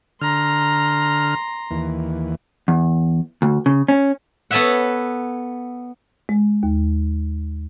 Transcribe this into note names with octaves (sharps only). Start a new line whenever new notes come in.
D3 A#5 C6 F6
D#2 E3
E2
D2
C#3
C#4
B3 A4 B4 C#5 E5 F#5
G#3
D#2